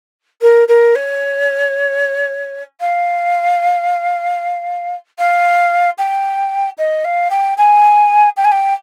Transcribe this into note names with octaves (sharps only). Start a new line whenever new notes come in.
A#4
A#4
C#5
F5
F5
G5
D#5
F5
G5
G#5
G5
G#5
G5